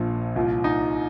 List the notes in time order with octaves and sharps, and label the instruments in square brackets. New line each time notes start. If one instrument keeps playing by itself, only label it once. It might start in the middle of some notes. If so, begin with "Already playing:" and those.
Already playing: [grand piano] A#1 A#2 F3
C2 A#2 F3
D#4